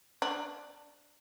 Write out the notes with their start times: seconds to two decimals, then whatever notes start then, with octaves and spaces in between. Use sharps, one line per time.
0.22 D4